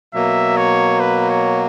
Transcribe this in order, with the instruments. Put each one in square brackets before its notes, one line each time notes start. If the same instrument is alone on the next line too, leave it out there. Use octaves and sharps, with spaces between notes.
[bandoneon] B2 F#3 A#3 [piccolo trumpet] E5
[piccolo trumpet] C#5
B4
C#5